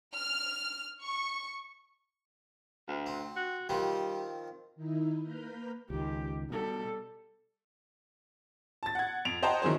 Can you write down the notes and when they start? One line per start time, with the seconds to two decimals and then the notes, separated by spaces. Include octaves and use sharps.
0.16 F6
1.02 C#6
2.88 D2
3.06 C4
3.36 F#4
3.69 D#3 F3 G3 C4
4.75 D#3 D#4 E4
5.22 A#3 B4 A#5 B5 F6 G6
5.90 C#2 D#3 G4
6.50 B2 G3 A4
8.83 A5 A6
8.95 F#5 G#6
9.25 F2 D7 F7
9.43 C5 D#5 F#5 G5 A5 A#5
9.62 D#3 E3 F#3 G#4 C5